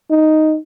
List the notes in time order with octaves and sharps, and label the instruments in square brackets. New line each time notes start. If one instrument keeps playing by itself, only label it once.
[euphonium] D#4